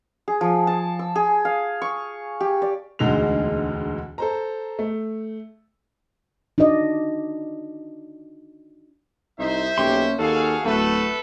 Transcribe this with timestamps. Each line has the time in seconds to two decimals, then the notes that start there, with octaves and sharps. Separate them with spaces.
0.28 G#4
0.41 F3
0.67 A5
0.99 E6
1.16 G#4
1.45 F5
1.82 C#6
2.40 G4
2.62 D5
2.99 E1 D2 D3 G#3 D#4 F7
4.18 A4 C5 A#5
4.79 A3
6.58 D4 D#4 F#4 D5 D#5
9.39 C2 D#4 C5 E5
9.78 B1 A#3 C#4 G4 C6
10.19 D#2 F#4 G#4 A4 F5
10.65 D1 A3 A4 B4